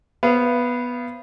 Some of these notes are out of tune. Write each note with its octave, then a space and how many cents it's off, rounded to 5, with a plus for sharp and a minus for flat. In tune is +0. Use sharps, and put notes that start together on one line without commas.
B3 -5 C5 +0 F5 -35